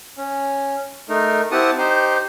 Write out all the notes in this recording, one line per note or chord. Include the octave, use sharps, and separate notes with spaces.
C#4
A3 D#4 A#4
C4 E4 G4 F#5 A5 D#6
D#4 G4 C5